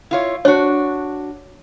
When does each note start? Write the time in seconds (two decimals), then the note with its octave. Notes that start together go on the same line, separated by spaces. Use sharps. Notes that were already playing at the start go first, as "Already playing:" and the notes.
0.11 E4 F4 C#5
0.45 D4 F#4 C#5